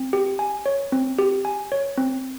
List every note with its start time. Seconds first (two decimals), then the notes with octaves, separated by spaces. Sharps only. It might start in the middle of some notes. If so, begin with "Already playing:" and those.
Already playing: C4
0.13 G4
0.39 G#5
0.66 C#5
0.92 C4
1.19 G4
1.45 G#5
1.72 C#5
1.98 C4